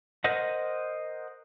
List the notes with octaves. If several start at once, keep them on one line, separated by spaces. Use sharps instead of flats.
A#4 C5 D#5 F#5